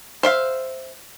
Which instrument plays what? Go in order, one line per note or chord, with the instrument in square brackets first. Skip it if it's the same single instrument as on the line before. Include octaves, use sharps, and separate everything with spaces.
[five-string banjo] C5 E5 F5